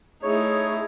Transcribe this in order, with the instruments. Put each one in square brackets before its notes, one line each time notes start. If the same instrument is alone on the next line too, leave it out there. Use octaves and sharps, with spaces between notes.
[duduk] A3 [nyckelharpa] D#4 E4 [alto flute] G#4 [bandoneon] C#5